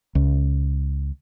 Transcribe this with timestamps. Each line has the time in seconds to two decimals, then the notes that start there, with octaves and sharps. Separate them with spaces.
0.15 C#2